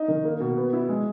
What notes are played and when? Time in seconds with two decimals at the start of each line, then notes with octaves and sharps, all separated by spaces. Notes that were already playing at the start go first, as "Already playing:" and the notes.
Already playing: D#4
0.08 D#3
0.24 A#3
0.40 B2
0.57 B3
0.73 E4
0.89 G#3